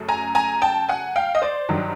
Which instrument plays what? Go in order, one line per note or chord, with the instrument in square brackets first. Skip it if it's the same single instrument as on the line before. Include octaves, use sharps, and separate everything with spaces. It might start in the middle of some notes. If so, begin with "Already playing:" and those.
Already playing: [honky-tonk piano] F#2 C#3 F#3 A3
G#5 A#5
G#5 A#5
G5 A5
F#5 G#5
F5 G5
D#5
C5 D5
G2 D#3 F#3